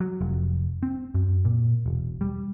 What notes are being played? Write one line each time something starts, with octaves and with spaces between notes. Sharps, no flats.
F#3
F1
C4
F#2
A#2
E1
G3